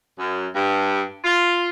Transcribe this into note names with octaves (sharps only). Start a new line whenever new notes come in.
F#2
G2
F4